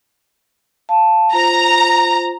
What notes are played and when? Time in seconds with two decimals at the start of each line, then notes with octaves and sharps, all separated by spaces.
0.89 F5 A5
1.33 F4 C5 A#5